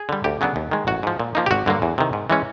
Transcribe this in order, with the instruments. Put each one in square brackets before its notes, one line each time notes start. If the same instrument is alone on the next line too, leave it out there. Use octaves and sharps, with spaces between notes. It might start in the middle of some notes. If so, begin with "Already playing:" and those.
Already playing: [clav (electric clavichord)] G#4
D3 G3
D2 G4
C#3 F#3 B3 D4
D#2
D#3 G#3
A1 F#4
G#2 F3
A#2
F3 A#3 D#4
G4
G#1 F#4
G2 D3 F#3 A#3
E2
C3 D#3
G#2
E3 G#3 C#4